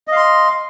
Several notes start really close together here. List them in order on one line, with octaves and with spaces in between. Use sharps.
D#5 F5 C6